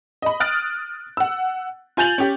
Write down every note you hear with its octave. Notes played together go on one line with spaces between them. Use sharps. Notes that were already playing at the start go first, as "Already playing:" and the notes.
D#5 B5
D#6 F6 F#6 A6 D7
F#5 E6
F4 G#5 G6 A6 F7 F#7
C#4 G4